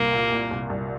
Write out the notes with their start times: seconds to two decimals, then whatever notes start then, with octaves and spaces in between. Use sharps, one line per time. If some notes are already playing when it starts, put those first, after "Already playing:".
Already playing: C2 A#2 A#3
0.13 A#2
0.32 A#2
0.51 C2
0.70 C2